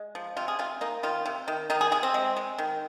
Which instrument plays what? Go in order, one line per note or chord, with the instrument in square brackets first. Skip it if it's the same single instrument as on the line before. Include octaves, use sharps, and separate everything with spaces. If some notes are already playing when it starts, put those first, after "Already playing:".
Already playing: [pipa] G#3
F3
C3 F4
G#4
C3 F4
A#3 D#4
D#3 F4
C3
D#3
D#3 D#4
G#4
C3 G#4
C4
G#3
G#3
D#3